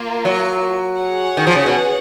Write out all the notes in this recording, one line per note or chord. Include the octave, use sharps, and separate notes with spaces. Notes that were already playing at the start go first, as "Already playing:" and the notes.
Already playing: A#3 F4 A#4
F#3
G#4 C#5 F#5
D#3
F3
C#3
B2